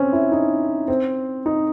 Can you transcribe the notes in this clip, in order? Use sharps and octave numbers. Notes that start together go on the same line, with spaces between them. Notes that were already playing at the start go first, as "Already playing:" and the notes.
Already playing: C4 C#4
E4
D#4
C4
D#4